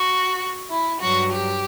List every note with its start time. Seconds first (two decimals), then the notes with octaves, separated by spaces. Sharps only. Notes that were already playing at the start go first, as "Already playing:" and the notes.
Already playing: F#4
0.71 E4
1.01 G2 F#3 F#4
1.32 G4